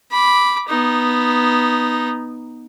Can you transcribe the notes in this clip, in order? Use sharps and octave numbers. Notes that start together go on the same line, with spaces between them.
B5 D6
B3 D#4